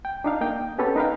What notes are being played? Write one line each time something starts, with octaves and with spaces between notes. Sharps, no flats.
G5
D4 D#4 F5
A#3 D#5 G5
B3 C#4 G4 A4 B4 C#5
D#4 A#4 B4 D#5 F5 G5